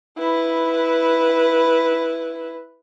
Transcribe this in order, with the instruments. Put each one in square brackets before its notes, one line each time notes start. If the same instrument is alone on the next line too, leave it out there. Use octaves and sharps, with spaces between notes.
[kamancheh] E4 B4